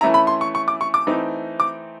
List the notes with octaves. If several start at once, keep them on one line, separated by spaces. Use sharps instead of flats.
E3 A3 C#4 E4 A#5
B5
C6
C#6
C#6
D6
C#6
D6
E3 A3 C4 D#4
D6